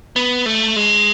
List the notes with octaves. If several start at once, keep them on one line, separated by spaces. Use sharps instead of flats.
B3
A3
G#3